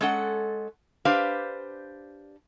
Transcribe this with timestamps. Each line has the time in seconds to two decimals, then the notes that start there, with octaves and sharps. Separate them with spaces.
0.01 G#3 C#4 A4 F#5
1.05 D4 G4 B4 C5 F5